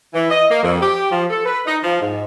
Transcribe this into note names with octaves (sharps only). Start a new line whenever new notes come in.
E3
D#5
A#3
F2
G4
F3
A4
B4
D#4
F3
G#2